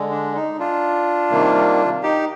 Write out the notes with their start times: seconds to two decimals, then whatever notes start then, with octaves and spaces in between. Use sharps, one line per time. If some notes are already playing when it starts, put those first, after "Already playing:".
Already playing: D3 G#3
0.11 D4
0.35 D#4
0.59 D4 F4
1.31 C3 D#3 G3 A#3
2.03 D#4 G4